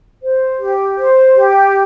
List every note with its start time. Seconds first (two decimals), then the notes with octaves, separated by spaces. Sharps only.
0.22 C5
0.60 G4
0.98 C5
1.35 G4